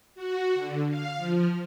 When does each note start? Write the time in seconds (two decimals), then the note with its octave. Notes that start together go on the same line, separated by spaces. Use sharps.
0.15 F#4
0.55 D3
0.89 F5
1.17 F3